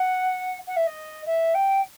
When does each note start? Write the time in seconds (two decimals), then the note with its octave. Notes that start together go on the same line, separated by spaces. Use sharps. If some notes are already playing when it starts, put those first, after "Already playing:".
Already playing: F#5
0.67 F#5
0.76 E5
0.87 D#5
1.26 E5
1.54 G5